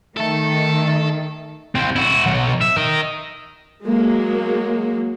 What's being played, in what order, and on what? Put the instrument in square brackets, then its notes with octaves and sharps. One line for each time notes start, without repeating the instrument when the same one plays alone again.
[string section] D#3 [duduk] A3 [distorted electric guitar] A4 A5
[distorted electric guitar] C2 C4
E4 F#4
B2 F#3
E5
A#4 D#5
[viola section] F#3 G#3 A#3